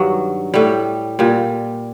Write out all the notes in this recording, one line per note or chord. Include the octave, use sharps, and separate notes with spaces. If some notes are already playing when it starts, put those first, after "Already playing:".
Already playing: G2 D#3 F#3
A2 G3
A#2 G3